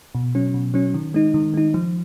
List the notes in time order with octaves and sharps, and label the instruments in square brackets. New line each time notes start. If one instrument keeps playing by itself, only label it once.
[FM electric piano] B2
F#3 C#4
B2
F#3 C#4
D#3
G#3 D#4
D#3
G#3 D#4
F3